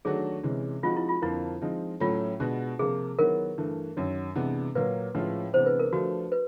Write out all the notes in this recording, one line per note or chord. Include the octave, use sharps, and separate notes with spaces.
D#3 F#3 A3 D4 F#4 G#4
C3 E3 G#3 C#4
F3 G#3 C4 D#4 F4 F#4
E4
F4
F2 D3 F3 A#3 E4
F3 G#3 C4 D#4
A2 F#3 A3 C#4 F4
B2 G#3 B3 D4 F#4
C3 F3 A#3 G#4
D#3 F#3 B3 E4 A#4
G2 E3 A3
F#2 D#3 F#3
C3 E3 G#3 B3 D4
A#2 F#3 A#3 B4
A2 F3 G#3 C#4 F4
C3 E3 G#3 B3 D4 C5
B4
A#4
F3 A3 D4 F#4
B4